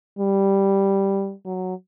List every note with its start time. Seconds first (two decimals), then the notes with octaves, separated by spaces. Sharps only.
0.19 G3
1.46 F#3